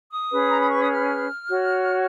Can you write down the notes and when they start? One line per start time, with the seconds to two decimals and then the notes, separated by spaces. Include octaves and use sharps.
0.11 D#6
0.31 C#4 G#4 B4
0.50 A#5
0.60 B5
0.70 C#6
0.80 D#6
0.91 F6
1.50 F#4 C#5